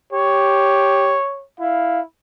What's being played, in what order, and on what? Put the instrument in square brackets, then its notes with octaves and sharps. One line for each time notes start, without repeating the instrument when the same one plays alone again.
[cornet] G4 [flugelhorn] C#5
[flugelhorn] E4 [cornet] F5